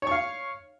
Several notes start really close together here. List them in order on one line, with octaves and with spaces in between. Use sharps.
C#5 C#6 F5